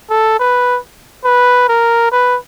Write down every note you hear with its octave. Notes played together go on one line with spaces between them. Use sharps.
A4
B4
B4
A#4
B4